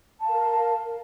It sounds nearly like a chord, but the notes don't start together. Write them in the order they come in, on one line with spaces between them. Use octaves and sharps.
A5 F5 A#4